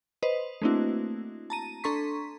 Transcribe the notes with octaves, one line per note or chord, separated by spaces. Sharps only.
B4 C5 D#5
A3 A#3 C4 D4 E4 F#4
A5 A#5 D#7
D4 A4 A#5 C6 C#6 B6